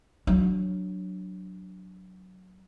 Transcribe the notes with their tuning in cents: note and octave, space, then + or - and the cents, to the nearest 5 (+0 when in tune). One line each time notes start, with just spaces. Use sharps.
F#3 +0 D4 +0